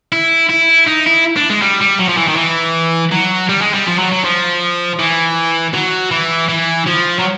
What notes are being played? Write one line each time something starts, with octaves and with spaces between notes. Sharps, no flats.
E4
E4
D#4
E4
D4
G#3
G3
G3
F#3
F3
E3
D#3
E3
F#3
G3
G#3
G3
F3
F#3
F#3
F3
E3
F#3
E3
E3
F3
F#3